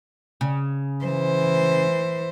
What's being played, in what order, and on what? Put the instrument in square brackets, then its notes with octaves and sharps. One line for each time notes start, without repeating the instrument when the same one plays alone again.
[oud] C#3
[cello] E3 C5